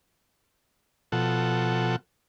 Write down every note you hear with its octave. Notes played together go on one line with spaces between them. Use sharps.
B2 F3 A4 F#5